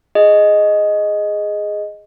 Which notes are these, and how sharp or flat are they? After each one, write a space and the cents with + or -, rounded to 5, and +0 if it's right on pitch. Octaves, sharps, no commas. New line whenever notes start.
G#4 +0 D#5 +0